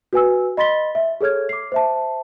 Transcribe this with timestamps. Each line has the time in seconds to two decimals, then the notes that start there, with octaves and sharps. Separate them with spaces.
0.13 F#4 B4 G#5 E6
0.57 D#5 B5 C6 A6 B6 G7
0.95 E5
1.21 G#4 A4 C#5 F6 G#6
1.49 D6 C7
1.72 C5 E5 A5